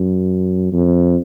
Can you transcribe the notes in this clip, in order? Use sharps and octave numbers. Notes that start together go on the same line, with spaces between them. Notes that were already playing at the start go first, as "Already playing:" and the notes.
Already playing: F#2
F2